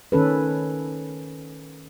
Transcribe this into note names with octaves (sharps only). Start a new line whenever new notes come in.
D#3 C#4 A4 B4